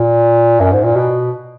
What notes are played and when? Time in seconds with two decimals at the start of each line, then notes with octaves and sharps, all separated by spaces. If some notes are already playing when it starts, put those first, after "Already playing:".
Already playing: A#2
0.60 F#2
0.73 G#2
0.84 A#2
0.96 B2